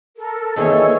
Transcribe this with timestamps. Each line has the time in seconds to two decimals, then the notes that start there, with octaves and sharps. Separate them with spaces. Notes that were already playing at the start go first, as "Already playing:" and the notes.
0.17 A4 A#4
0.56 D#3 E3 G3 A#3 G#4 A4 C#5 E6